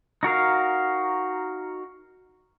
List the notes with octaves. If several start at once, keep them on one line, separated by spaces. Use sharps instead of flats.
D#4 F#4 A#4 F5